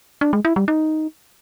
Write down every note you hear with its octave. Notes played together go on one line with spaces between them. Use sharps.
D4
G#3
E4
G3
D#4